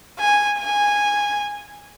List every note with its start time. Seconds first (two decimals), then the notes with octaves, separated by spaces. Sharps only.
0.19 G#5
0.59 G#5